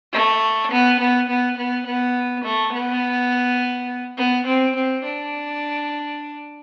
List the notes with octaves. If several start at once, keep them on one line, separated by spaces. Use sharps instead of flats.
A3
B3
B3
B3
B3
B3
A3
B3
B3
C4
C4
D4